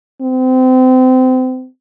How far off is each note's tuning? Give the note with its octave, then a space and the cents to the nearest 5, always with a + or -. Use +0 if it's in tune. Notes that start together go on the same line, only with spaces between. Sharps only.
C4 -30